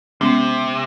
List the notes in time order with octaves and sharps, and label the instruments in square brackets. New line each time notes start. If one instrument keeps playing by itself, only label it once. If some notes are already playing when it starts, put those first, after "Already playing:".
[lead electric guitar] C3 [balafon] G#3 B3 C#4